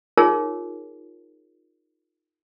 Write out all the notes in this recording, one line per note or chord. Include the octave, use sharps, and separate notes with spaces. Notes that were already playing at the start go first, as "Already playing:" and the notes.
D#4 F4 G#4 A#4 C#5